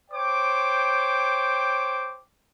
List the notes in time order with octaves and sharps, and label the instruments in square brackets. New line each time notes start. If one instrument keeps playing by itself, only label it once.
[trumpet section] C5 C#5 G5 D6